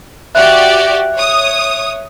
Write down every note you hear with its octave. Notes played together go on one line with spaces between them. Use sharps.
F#4 G4 D5 E5 F#6
C#5 D#6